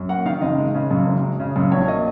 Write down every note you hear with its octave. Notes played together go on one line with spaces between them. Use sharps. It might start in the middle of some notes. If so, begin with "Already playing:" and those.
Already playing: F#2
A#3 F#5
D#3 F5
F#1 D#5
G#3
C#3
F#2
F#1
G#3
C#3
F#2
A#1 C#5
A#3 D#5